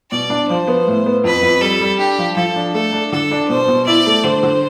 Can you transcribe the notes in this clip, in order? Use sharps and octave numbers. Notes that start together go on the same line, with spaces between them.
B2 D5
D4
F3 C5
B3
A2
B3
F2 B4
F2
G3 A4
G3
D4 G4
F3
F3 A4
D4
A3 A4
D4
D3 A4
D4
B2 C5
B2
E4 D5
A3
D3 C5
D3